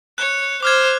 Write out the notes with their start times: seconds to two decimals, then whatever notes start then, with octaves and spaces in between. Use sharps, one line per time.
0.18 C#5 F#6
0.63 C5 D6 F6 G#6